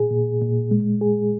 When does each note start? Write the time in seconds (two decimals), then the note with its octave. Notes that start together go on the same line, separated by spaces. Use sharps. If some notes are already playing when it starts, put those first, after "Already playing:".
Already playing: A#2 G#4
0.11 A#2
0.41 A#2
0.71 G#3
1.01 G#4